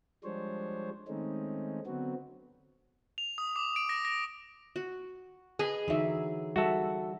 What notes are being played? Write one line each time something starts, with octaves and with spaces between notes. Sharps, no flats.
F3 G3 G#3 D4 C5 C#5
D#3 G#3 A3 C4 C#4 D#4
D3 F#3 B3 C4 F#4
F7
D#6
D6
D7
A#6
A#6
F#4
G#4 B4 D#5
D3 E3 F#3 D#4 E5
G3 F#4 A4 E5